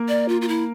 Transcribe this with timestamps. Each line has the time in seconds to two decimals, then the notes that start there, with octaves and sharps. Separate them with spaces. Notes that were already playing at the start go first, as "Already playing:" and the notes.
Already playing: A#3 A#4
0.08 D5
0.28 F4
0.41 F4
0.48 E4